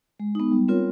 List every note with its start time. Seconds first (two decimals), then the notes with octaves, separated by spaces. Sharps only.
0.20 G#3
0.35 B3 D#4
0.52 G3
0.68 C4 F4 A#4 C#5